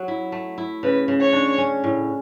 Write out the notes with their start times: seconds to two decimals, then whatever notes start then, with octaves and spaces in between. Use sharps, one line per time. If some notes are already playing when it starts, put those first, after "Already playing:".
Already playing: F#3
0.08 E4
0.32 A3
0.58 E4
0.83 C#3 B4
1.08 C#3
1.20 C#5
1.33 D4
1.58 C#4
1.84 A2